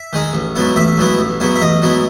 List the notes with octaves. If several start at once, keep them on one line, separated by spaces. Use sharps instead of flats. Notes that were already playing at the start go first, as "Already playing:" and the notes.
Already playing: E5
D#3 G#3 D#4
A1
G#2 F#3 B3 E4
A1 E5
G#2 F#3 B3 E4
A1
G#2 F#3 B3 E4
E5
A1 D#5
G#2 F#3 B3 E4